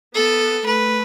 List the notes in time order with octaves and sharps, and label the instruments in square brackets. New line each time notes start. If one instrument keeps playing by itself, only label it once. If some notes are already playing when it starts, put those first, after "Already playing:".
[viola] B3 [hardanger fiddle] A4
[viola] A3 [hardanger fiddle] B4